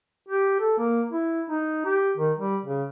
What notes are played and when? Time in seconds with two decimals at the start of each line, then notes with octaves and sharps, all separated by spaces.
0.29 G4
0.60 A4
0.78 A#3
1.12 E4
1.50 D#4
1.85 G4
2.17 D#3
2.39 G3
2.65 C#3